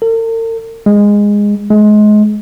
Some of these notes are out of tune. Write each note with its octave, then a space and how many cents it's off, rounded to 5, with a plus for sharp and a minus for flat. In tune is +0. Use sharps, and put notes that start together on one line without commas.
A#4 -45
G#3 -15
G#3 +25